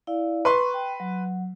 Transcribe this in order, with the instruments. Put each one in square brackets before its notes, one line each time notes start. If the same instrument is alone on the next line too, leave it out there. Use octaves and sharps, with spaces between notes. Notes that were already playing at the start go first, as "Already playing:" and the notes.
[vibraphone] E4 D5 F5
[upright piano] B4 C6 [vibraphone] C#6
[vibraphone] G5
F#3